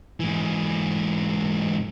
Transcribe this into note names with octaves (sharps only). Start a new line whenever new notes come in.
G#2 E3